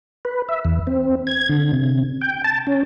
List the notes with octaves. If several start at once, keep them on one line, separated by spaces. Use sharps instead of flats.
B4
E5
E2
C4
G#6
D3
C3
G5
A5
C#4